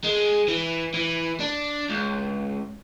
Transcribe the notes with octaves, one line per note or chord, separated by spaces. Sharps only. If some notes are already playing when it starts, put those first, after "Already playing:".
G#3
E3
E3
D4
C#2